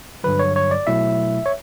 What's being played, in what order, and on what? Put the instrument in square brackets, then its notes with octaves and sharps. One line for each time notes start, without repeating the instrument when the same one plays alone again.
[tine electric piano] G2 D3 F#3 B4
C#5
C#5
D5
B2 F#3 A3 E4 E5
C#5